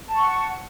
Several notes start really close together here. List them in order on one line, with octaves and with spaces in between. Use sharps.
A5 C#6 F#5